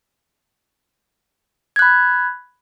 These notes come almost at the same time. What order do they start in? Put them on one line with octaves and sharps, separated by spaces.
G#6 F#6 B5